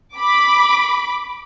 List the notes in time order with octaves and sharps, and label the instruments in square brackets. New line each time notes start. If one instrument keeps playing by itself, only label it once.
[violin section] B5 D6